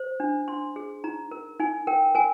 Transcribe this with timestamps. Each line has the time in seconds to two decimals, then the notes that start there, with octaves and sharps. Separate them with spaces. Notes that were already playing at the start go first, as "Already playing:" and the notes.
Already playing: C5
0.20 D4
0.48 D4 C6
0.76 G#4
1.04 D#4 A#5
1.31 A#4
1.60 D#4 G#5
1.87 A#4 G5
2.15 A#4 G#5